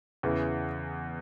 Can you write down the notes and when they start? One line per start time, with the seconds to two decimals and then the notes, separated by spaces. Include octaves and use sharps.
0.23 E2 C#3 E3